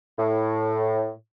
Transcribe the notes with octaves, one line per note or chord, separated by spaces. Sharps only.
A2